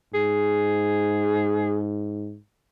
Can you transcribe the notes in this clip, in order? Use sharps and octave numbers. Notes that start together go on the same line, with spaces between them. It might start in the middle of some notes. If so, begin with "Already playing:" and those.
G#2 G#4